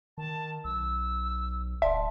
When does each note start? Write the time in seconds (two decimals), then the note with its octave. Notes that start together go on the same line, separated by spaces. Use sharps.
0.18 D#3 A5
0.64 B1 E6
1.82 D1 D5 E5 A5 C6